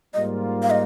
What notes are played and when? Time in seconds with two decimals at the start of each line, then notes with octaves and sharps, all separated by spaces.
0.14 G#2 G3 A#3 F4 D#5
0.63 F5
0.70 D#5